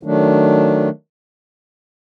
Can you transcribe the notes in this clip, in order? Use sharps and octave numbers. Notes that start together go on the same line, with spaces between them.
D#3 F#3 A3 D4